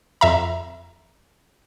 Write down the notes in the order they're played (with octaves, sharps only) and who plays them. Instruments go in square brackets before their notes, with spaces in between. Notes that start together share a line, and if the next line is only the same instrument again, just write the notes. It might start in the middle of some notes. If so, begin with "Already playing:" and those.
[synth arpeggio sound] F2 E5 A#5